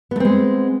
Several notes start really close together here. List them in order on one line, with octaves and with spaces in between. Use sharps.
B3 A3 C4 G#3